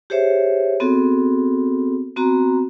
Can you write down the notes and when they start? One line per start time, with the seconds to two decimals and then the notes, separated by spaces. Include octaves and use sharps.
0.10 G4 G#4 C5 C#5 E5
0.80 B3 C4 F#4 G#4 A4
2.16 B3 C4 F#4 A#5